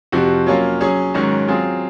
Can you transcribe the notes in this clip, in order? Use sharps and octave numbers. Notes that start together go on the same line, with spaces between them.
F2 C3 F3 C4 F#4
F#3 A#3 C#4 F4
F#3 C#4 G#4
G#2 D#3 F#3 C#4 F#4
F#3 C4 F4 G#4